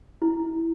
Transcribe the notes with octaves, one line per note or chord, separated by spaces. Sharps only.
E4